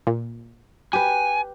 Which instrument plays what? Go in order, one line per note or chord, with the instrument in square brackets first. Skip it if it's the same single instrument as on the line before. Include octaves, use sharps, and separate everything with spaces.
[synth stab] A#2
[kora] G4 B4 [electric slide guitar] G#5